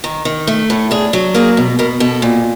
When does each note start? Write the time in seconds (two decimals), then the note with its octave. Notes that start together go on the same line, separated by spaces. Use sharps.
0.04 D#3
0.25 D#3
0.47 A3
0.70 A2
0.91 D4 G#4
1.13 F#3
1.34 A#3 G#4
1.57 B2
1.79 B2 A#4
2.00 B2 A4
2.22 A#2